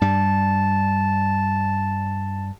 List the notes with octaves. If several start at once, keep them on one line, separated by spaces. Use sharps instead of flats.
G2 G3 A5